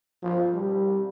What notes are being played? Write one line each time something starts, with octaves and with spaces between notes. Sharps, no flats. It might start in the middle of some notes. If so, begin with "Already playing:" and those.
F3
G3